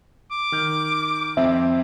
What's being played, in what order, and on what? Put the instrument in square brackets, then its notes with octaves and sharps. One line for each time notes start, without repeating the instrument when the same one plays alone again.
[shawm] D6
[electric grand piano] D#3 F6 G6
[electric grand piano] F2 C4 [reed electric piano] E5